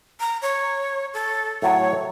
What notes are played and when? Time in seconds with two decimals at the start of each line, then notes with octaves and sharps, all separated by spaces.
0.20 A#5
0.42 C#5
1.14 A4
1.62 A2 F#3 C#5